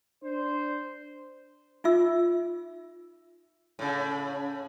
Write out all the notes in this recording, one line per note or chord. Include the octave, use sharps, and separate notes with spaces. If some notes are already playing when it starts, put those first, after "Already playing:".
D4 C5
D#4 F4 E5 E6
A2 C#3